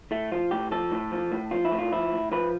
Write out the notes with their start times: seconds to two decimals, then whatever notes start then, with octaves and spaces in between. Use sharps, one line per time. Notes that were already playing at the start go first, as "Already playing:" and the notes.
0.11 A2 A3
0.32 F3 F4
0.51 A2 G4
0.71 F3 A4
0.92 A2
1.12 F3
1.32 A2
1.51 F3 F4
1.65 E4
1.72 A2
1.79 F4
1.92 F3 E4
2.12 A2
2.32 F3 B4